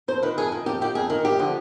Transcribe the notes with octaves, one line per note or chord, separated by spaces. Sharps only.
F2 C5
D#3 B4
F2 G#4
D#3
F2 G4
D#3 G4
F2 G#4
D#3
G2 G4
D3 F3